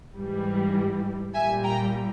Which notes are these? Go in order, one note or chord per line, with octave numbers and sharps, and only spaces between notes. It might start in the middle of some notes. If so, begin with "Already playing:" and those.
G#2 E3 G3
A#2 G3 E5 G#5
G5 A#5